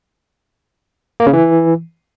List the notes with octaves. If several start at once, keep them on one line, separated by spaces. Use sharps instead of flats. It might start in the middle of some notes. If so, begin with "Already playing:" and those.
A#3
C#3
E3